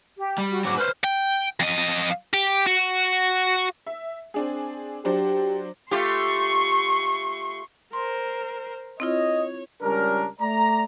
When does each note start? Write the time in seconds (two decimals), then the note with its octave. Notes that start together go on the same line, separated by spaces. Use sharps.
0.17 G4
0.38 G3
0.50 F#4
0.65 G#2 F#3 F#4 D6
0.77 B4 C5 F6
1.04 G5
1.60 F2 D#5
2.33 G4
2.67 F#4
3.87 E5
4.34 C4 D4 G#4
5.05 F#3 D4 G4 C5
5.91 A3 F4 G4 C6 C#6
7.93 A#4 C5 C6
9.00 C4 E4 F4 C#5 D#5
9.82 C#2 G3 C#4 D4 A#4
10.41 A3 D5 A#5